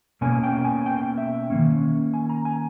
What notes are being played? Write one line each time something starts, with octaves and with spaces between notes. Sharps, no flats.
B2 A#3 C#4 G#5
G5
G#5
G5
E5
D#3 A#3 C#4
G#5
A#5
G#5